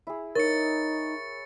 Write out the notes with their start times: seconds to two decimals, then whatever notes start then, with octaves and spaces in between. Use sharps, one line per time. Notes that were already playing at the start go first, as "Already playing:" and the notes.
0.07 E4 G#4
0.35 D#4 A#4 C#5 A6 C#7